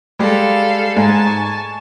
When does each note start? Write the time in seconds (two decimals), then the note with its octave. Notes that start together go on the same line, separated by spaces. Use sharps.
0.19 G3 G#3 G4 A4 F5
0.96 G#2 G#3 G#5 A5
1.26 C#6